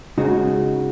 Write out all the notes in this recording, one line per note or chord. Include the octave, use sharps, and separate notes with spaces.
C#3 G#3 D#4 F#4